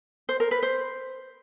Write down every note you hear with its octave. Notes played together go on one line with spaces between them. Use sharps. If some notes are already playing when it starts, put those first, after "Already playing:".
C5
A#4
B4
C5